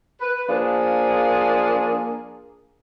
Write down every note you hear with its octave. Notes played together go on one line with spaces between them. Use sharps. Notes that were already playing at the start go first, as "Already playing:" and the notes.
B4
F3 A#3 D4 G#4